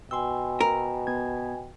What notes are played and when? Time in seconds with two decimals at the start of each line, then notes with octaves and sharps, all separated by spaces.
0.11 B2 G5 G#5 C6 E6
0.61 A#4
1.07 B3 G#6